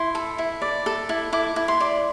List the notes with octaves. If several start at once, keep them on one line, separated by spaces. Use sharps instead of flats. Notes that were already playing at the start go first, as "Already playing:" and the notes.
Already playing: E4 C6
A4
E4
D5
A4
E4
E4 D6
E4
C6
D5